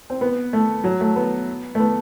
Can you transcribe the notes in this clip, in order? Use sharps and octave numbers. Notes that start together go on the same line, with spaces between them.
C4
B3
A3
F#3
A3
B3
A3
B3